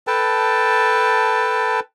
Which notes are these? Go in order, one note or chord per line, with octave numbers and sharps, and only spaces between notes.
A4 B4 G5 A5